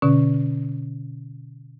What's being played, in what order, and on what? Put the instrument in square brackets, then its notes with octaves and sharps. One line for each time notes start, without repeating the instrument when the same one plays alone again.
[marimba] B2 D3 C#4